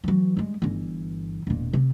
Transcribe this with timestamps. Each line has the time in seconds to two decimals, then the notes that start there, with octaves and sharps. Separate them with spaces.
0.04 E3 F#3
0.37 G2 G#3
0.62 G1 E3
1.47 E1 A#2
1.73 C3